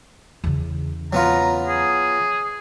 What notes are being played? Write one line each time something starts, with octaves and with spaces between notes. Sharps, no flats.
E2 C#3
F#3 B3 F4 A#5
G#4